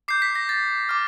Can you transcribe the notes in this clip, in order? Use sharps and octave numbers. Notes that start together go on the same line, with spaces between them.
D6 G6 C7
B6
A#6
A6
D6 F6